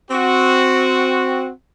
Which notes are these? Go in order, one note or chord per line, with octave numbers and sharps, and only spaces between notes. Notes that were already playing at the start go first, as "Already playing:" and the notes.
C4 F#4